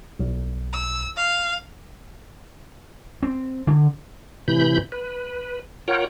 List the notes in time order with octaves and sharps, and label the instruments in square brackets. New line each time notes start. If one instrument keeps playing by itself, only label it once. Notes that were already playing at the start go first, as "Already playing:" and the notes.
[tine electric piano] B1
[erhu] E6
F5
[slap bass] C4
D3
[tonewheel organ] A2 C3 E3 B5 G6
B4
F4 A#4 C#5 F#5 G5